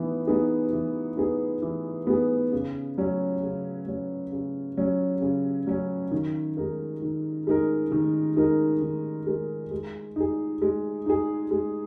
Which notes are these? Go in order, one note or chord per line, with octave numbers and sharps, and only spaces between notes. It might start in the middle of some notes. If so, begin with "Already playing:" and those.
Already playing: E3 B3 D#4
B3 D#4 G#4
E3
B3 D#4 G#4
E3
B3 D#4 G#4
C#3
F#3 C#4
C#3
F#3 C#4
C#3
F#3 C#4
C#3
F#3 C#4
D#3
G#3 D#4 A#4
D#3
G#3 D#4 A#4
D#3
G#3 D#4 A#4
D#3
G#3 D#4 A#4
G#3
D#4 G#4
G#3
D#4 G#4
G#3